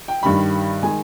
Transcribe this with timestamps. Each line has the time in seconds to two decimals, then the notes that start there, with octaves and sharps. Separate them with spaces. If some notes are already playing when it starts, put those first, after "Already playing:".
0.08 G5
0.23 G2 D#3 G3 B5
0.83 D#3 G#3 G#5